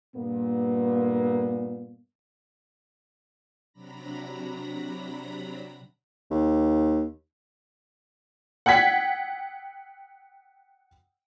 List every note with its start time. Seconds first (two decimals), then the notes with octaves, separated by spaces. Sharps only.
0.16 G2 A#2 A#3 B3
3.73 C3 F#3 D4 A#5 B5 A#6
6.31 D#2
8.66 F#5 G5 G#6 B6